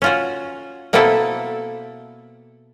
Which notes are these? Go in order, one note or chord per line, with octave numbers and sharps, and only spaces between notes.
C#4 F4 F#4
B2 A#3 C4 E4 A4 B4